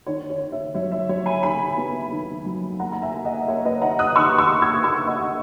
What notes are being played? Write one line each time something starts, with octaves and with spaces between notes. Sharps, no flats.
D#3 C#5
C#5
D#3
C#5 E5
F#3 C#5 E5
C#5 E5
F#3 C#5
G#5 B5
D#3 G#5 B5
B3
D#3
F#3
A#3 F#5 A#5
A#5
E5 G#5
A#3
D#5 F#5
A#3 C#5 E5
B4 D#5
D#3 F#5 A#5
D#6 F#6
D#3 C#6 E6
C#6 E6
A#3
E6 G#6
A#3 C#6 E6
D#5 F#5
D#3